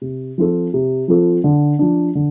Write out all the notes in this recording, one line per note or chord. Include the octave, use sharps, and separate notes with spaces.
C3
F3 C4 F4 A4
C3
F3 C4 F4 A4
D3
F3 D4
D3